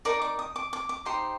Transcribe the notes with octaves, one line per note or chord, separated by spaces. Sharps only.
D#4 A#4 D5 D6
D6
D#6
D6
D6
D6
D#4 G4 C5 C6